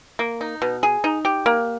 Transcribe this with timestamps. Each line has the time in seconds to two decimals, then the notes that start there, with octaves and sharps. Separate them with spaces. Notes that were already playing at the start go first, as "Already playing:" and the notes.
0.19 A#3
0.41 D#4
0.62 B2
0.83 G#4
1.04 D#4
1.25 G4
1.46 A#3